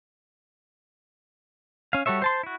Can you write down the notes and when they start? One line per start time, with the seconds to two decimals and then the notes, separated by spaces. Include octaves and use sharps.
1.93 C#4 F5
2.06 G3 F#4 A4 C#5 E5
2.22 C5 A5 C6
2.43 E4 F#4